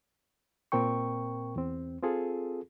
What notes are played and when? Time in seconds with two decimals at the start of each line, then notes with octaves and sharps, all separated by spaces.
0.72 A#2 C4 A#4 G5 C#6
1.56 E2 C4
2.03 C4 F4 G#4 A4